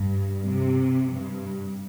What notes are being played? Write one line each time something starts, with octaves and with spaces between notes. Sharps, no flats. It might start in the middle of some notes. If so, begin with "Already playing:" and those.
Already playing: G2
C3
G2